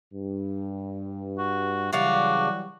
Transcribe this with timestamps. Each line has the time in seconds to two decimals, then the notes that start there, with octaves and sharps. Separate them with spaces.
0.13 G2
1.38 F#4
1.93 C#3 E3 F#3 G3 D4 F#4 F5